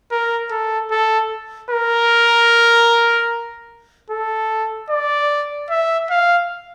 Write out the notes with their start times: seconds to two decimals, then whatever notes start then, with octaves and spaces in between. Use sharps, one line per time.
0.11 A#4
0.51 A4
0.91 A4
1.70 A#4
4.10 A4
4.90 D5
5.70 E5
6.10 F5